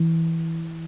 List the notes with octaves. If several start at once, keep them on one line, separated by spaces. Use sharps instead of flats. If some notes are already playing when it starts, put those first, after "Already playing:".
Already playing: E3